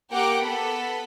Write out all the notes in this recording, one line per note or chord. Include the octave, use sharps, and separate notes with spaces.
A#3 G4 A#4 F#5 G5 D6
B3 A4 B5